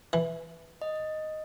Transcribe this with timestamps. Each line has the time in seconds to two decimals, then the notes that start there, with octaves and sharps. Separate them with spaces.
0.13 E3
0.82 D#5